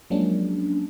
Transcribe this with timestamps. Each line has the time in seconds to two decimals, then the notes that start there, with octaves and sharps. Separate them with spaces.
0.10 F3 F#3 G#3 A#3 C#4 D4